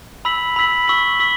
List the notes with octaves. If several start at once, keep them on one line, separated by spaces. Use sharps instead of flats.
B5 E6 B6 F#7
B5 E6 B6 F#7
C#6 E6 B6 F#7
C#6 E6 B6 F#7